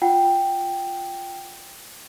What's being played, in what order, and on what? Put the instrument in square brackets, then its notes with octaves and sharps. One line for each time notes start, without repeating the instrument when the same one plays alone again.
[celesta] F4 F#5 G5